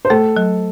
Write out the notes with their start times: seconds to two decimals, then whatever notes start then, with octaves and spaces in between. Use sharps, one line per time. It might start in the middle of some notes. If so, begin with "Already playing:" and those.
0.05 C5
0.10 A3 A4
0.36 F#3